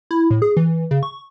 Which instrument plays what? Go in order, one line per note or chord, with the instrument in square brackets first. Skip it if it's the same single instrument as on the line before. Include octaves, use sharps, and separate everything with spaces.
[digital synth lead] E4
A2
G#4
E3
C#3
C#6